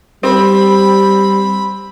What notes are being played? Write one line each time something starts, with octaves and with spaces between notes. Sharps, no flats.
G3 C4 B5